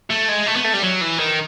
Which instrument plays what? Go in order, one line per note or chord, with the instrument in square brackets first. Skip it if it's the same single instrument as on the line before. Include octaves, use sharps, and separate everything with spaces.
[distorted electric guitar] A3
G#3
A3
B3
A3
G3
F#3
E3
D#3